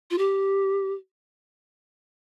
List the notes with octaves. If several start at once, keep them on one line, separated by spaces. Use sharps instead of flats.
F4
G4